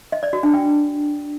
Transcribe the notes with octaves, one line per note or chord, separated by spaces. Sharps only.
D#5
D5
F#4
D4
G5